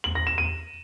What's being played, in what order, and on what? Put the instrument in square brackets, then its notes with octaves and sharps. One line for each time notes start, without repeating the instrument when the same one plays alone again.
[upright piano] F#7
A#6
E7
D#7